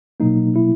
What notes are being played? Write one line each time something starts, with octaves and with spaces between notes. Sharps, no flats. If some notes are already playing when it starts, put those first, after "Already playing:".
B2 F#3 A#3 D#4
E4